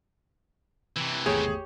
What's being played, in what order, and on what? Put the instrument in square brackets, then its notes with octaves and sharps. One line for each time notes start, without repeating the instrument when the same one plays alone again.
[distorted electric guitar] C3 E3 [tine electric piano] E6
[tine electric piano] G#1 E2 A3 [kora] G4 C#5 G5 [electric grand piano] G#4